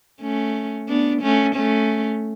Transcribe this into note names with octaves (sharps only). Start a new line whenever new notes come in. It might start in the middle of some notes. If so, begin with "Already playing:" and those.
A3 C#4
B3 D4
A3 C#4
A3 C#4